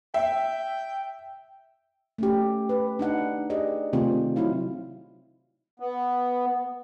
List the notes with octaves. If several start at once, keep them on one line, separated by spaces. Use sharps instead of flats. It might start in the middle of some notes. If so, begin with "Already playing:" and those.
E5 G5
A3 C#4 G4
B4
D4 D#4 F#5
G4 G#4 D5 D#5
C3 D#3 A3 C4 F4 C5
F#3 D#4 E4 F5
B3